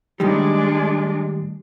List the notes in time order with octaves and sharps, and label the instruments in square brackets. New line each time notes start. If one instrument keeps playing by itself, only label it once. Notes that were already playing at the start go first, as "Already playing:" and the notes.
[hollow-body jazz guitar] A2 D#3 G3 [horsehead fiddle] G#3 D4